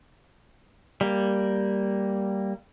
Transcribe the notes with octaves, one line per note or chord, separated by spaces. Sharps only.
G3 A#3